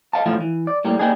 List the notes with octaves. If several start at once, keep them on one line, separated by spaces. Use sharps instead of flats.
D#5 F5 A5
A2 F3 A3 F4
E3
D5
A2 G3 A#3
A#3 D4 D#4 G4 G#4